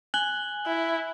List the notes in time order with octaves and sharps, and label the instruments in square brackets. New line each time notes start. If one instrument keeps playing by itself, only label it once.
[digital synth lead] G#5 [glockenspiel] F#6 F#7 G7
[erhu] E4